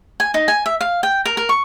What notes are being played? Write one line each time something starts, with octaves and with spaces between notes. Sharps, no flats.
G#5
D#4
G#5
E5
F5
G5
A#4
A#4
C#6